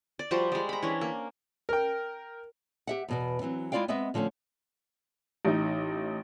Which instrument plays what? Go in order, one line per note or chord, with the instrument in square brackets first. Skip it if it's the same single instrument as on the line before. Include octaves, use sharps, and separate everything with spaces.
[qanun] D5
F3 G3 F#4 C5
G3 G#3
A#5 B5
E3 C#4 D4
A#3
[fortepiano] A#4 G5
[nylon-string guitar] G4 E5 F#5
E2 B2 B3
E3 F#3 C4
G#3 E4 F4 D5 F5 G5
G#3 B3 C4 D#5 E5
D3 F3 A3 C4 C#4
[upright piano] A1 D#4